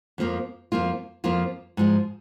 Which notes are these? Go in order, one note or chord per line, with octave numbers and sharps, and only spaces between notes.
F2 F3 A#3
F2 F3 A#3 F4
F2 F3 A#3 F4
G#2 F3 G#3